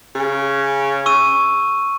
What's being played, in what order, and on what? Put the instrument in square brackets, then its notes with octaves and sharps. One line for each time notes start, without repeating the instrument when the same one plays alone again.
[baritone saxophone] C#3
[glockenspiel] C#6 E6 D#7